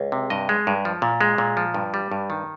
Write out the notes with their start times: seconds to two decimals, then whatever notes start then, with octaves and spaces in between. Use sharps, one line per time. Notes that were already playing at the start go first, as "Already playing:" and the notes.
Already playing: C#2
0.12 C3
0.30 G2 D#5
0.49 G#3
0.67 G2
0.85 F3
1.02 A#2
1.21 G#3
1.38 A#2
1.57 F3
1.74 G2
1.94 G3
2.11 G2
2.30 D#3